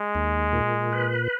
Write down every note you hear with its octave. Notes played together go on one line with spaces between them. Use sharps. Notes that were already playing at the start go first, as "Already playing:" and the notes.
Already playing: G#3
D#2
A#2
B4